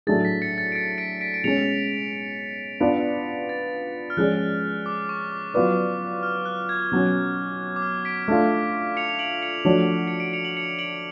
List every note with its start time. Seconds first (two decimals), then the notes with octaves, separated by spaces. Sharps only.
0.07 A2 F#3 A3 D4 G#4 A6
0.25 B6
0.42 A6 C#7
0.58 A6 C#7
0.72 D7
0.75 A6 C#7
0.98 B6 D7
1.21 B6 D7
1.34 D7
1.44 B2 G#3 C#4 C#7 F7
2.80 B3 D4 F4 B4 D5
3.49 A6
4.10 F6
4.17 F3 G#3 C#4 G#4 D5 F#6
4.86 D6
5.09 C#6
5.31 D6
5.54 F#3 B3 F4 B4 D5 D6
6.23 F6
6.45 F#6
6.69 G#6
6.92 B2 F#3 C#4
7.76 D6
7.82 F6
8.05 B6 D7
8.28 A3 D4 F4
8.97 C#7 F7
9.09 F7
9.19 D7 F#7
9.42 C#7 F7
9.65 F3 A3 D4 F#4 C#5
10.07 C#7
10.20 D7
10.33 C#7 F7
10.45 F#7
10.57 C#7 F7
10.79 D7 F#7